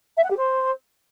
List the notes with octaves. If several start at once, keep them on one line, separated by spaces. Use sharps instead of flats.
E5
F#5
G4
C5